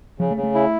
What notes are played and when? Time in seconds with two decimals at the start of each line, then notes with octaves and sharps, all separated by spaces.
0.19 C#3 F3
0.31 A3
0.37 C#3
0.43 A3
0.55 E4